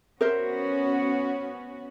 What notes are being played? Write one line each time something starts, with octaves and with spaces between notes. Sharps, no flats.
B3 C#4 F#4 A#4 C5 E5